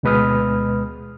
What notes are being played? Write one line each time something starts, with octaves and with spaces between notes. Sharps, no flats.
D2 B2 G#3 B4 D#6 F6